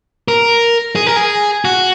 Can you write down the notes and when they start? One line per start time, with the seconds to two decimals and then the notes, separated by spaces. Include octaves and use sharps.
0.28 A#4
0.96 G#4
1.07 A#4
1.16 G#4
1.65 F#4